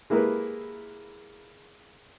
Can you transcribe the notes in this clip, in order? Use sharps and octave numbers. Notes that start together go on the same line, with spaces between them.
G#3 A#3 E4 G4 A#4 B4